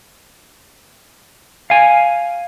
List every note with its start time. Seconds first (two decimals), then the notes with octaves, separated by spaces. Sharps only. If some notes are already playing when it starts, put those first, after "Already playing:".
1.70 F5 G#5